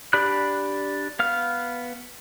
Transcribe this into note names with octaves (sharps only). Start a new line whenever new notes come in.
D4 G4 D5 B5 F#6
B3 F5 F6